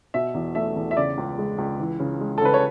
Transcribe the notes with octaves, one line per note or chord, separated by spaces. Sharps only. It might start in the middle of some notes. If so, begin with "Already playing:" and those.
B2 E5
E2
A3 E5
E2
E5
C#3 D5
C#2
G#3
C#2
E3
C#3
G#3
A4
C#3 B4
C#5